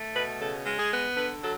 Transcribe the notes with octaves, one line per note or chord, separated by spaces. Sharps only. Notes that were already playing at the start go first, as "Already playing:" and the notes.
Already playing: A3
B2 B4
C#3 A4
G#3
G#4
B3
D3 B4
F#3 A4